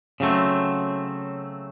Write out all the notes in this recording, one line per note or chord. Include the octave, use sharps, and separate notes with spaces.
C#3 F#3 A3 C4